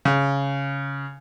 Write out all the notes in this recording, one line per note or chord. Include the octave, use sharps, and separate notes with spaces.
C#3